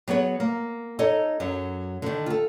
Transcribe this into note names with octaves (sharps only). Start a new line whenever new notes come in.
F#3 B3 G#4 C#5
A#3
D#4 A4 C#5 D#5
F#2 F#3
D3 D#3
F4 A4